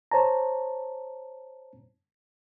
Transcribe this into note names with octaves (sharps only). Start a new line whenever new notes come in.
C5 C#5 A5 A#5